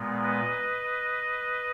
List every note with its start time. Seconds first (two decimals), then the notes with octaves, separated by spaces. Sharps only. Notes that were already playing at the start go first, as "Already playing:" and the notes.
Already playing: A#2 G#3 B3
0.23 B4 D#5